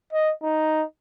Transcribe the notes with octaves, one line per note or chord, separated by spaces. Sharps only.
D#5
D#4